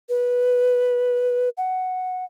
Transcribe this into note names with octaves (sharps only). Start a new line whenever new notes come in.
B4
F#5